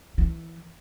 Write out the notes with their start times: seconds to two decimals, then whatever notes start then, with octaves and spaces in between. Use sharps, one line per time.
0.18 E3